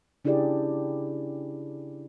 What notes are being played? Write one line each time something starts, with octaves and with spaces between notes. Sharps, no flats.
C#3 D4 E4 G4 G#4 D5